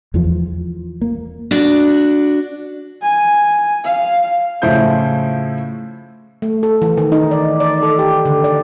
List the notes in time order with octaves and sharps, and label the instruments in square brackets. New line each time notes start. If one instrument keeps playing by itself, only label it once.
[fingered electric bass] E2 E3 F3
A#3
[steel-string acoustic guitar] D4 F#4 D5
[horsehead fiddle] G#5
F5
[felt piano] A2 C#3 F3 E4 C5 G6
[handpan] A3
A4
E3
D#3
D#4
D5
D5
A4
G4
D3
D5